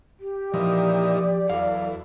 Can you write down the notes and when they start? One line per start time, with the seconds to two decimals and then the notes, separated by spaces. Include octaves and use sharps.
0.19 G4
0.54 A#2 E3 F3 D#4 D5
1.49 E2 F#3 A4 F5